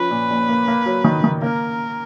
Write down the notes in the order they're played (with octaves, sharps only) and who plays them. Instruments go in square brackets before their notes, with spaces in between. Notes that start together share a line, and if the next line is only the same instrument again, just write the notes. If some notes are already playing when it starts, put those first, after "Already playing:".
Already playing: [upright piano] F3 C#4 [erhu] B4
[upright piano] A#2
A#1
A#3
A#3
F#3
D#3
D#3
[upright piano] A#3 [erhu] A#4